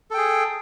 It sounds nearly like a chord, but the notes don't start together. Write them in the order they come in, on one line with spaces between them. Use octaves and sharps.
A4 G5 G#4